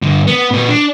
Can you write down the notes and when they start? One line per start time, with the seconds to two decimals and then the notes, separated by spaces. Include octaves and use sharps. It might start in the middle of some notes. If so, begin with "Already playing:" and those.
0.02 G2 D3
0.27 B3
0.51 A#2 B4
0.68 D4